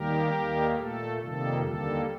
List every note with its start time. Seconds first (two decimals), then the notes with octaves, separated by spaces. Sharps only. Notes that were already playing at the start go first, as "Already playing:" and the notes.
Already playing: D#2 D#3 G3 A#3 G4 A#4
0.31 D#2 D#3 G3 A#3
0.74 A#2 A3 A4
1.18 F2 C3 D#3 G3 A#3 A4
1.61 D#2 D3 G3 A#3 A4